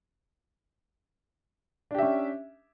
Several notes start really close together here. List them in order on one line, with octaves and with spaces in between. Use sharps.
D4 G4 E5 C#4